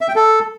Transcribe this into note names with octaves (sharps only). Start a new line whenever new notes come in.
E5
G5
A4